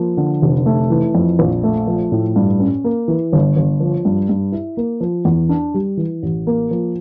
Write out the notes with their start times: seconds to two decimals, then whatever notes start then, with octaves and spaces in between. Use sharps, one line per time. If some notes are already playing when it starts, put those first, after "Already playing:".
Already playing: F3 A#3
0.17 D3
0.42 F1
0.66 A3
0.90 E3
1.15 F2
1.39 A#1
1.63 A3
1.87 F3
2.12 A2
2.36 G2
2.60 C#4
2.84 A#3
3.08 E3
3.33 G1
3.56 G1
3.80 F3
4.05 G2
4.29 G2
4.52 E4
4.77 A#3
5.01 F3
5.25 E2
5.49 D4
5.74 G3
5.97 E3
6.23 A1
6.47 A#3
6.71 F3